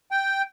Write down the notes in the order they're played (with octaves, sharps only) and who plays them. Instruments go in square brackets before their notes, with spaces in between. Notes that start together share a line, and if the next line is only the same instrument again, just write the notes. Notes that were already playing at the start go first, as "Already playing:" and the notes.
[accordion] G5